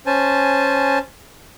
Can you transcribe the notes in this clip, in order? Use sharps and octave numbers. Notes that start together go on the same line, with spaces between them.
C#4 C5 G#5 A5